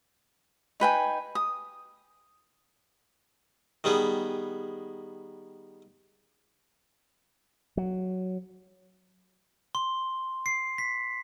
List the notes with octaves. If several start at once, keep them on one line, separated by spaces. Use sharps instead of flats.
D#4 B4 G5 G#5
D#6
D#3 G3 B3 G#4
F#3
C6
C7
B6